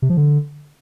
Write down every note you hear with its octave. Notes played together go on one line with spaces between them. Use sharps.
C3
F3
D3